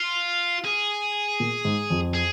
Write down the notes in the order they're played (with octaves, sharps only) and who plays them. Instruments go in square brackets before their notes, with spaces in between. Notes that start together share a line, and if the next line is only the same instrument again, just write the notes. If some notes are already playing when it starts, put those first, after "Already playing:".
Already playing: [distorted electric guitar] F4
G#4
[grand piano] A#2
G#2
F2
[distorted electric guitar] G#4